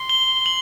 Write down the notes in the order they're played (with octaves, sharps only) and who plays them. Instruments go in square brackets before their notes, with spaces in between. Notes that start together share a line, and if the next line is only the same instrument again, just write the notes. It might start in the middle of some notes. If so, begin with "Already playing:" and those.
Already playing: [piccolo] C6
[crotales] G7
F#7